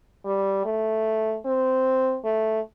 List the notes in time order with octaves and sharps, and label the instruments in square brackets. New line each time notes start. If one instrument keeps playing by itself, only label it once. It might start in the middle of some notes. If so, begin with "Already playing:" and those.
[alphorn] G3
A3
C4
A3